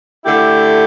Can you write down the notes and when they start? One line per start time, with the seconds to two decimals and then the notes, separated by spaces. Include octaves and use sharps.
0.23 D3 A3 E4 G4